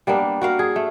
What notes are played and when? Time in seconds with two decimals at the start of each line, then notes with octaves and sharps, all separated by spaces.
0.07 G3 A#3 B3 D4
0.41 F#4 A#4 F5
0.59 G#4
0.76 A3